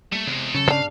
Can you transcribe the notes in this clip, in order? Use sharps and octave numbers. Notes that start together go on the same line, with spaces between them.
G3 A3 A#3
E2 C3 G#3
D#1 C#3 F#3 A4
G2 B2 D4 F5